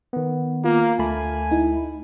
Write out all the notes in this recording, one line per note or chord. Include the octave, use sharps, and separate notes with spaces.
D#3 B3
A#3 F4
D2 A3 G#5 A5 B5
D#4 E4